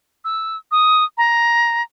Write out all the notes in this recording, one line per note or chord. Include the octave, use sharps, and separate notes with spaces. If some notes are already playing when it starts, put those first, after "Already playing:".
E6
D#6
A#5